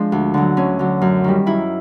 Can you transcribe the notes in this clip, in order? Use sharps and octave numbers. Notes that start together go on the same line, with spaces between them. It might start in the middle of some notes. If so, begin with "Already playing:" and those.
Already playing: F3 G#3 D4
D2
D3 F#3
D2 C#4
D3 F#3
F#2
D#3 G3
F#2 E4